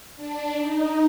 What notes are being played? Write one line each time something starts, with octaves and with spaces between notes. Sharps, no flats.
D4
D#4